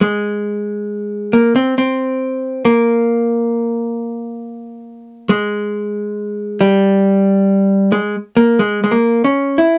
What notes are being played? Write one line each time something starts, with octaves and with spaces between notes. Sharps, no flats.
G#3
A#3
C4
C4
A#3
G#3
G3
G#3
A#3
G#3
G#3
A#3
C#4
E4